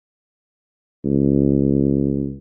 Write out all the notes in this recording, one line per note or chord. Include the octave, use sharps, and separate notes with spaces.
C#2